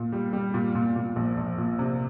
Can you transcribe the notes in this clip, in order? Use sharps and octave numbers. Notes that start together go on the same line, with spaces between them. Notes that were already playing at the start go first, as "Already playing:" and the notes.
Already playing: A#2
G3
G3
A#2
A#2
A#2
A#1
A#1
A#2
C3